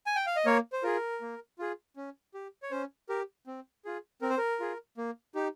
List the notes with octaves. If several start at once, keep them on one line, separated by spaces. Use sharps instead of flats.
G#5
G5
F5
D#5
A#3 A#4 C#5
C5
F4 G#4 A#4
A#3
F4 G#4
C#4
G4
C#5
C#4 C5
G4 A#4
C4
F4 G#4
C4 A#4
C5
A#4
F4 G#4
A#3
D#4 G4